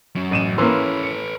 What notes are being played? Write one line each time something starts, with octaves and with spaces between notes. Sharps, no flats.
F#3 C#4
A1 D#7 E7
E3 A#3 C#4 A4 B4 C6
C#7